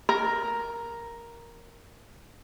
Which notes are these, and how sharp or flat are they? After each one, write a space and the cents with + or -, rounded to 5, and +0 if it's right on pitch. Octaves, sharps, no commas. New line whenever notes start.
A#4 +5